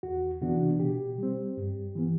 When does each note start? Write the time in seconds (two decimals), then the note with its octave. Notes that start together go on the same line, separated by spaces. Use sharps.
0.03 E2 F#4
0.41 C3 E3 B3 D4 F#4
0.80 B2 G4
1.18 G3 C4
1.57 G2
1.95 E3 B3